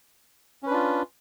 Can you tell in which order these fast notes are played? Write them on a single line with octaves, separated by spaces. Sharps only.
C#4 B4 D4 F4